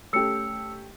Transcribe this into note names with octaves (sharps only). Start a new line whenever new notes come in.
A3 C#4 G4 E6 C#7